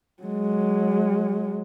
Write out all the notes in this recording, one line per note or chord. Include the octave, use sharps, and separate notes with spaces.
F#3 G#3